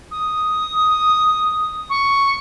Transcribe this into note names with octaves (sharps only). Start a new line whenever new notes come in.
D#6
C#6